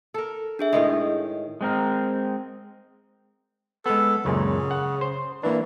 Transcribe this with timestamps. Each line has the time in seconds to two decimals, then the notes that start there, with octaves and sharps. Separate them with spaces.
0.14 A4 A#4
0.59 D4 G#4 E5
0.73 A2 D#3 G#3 D#5
1.61 G#3 C4 A#4
3.86 G#3 B3 A4
4.25 C#2 F#2 A#2 C#3
4.71 F#5
5.01 C5
5.43 E3 A#3 D4